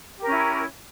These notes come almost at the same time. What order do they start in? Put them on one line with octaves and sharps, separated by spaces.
G4 A#4 C#4 E4